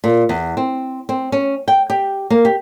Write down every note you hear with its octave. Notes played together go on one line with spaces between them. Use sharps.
A#2
E2
C4
C4
C#4
G5
G4
A#3
G4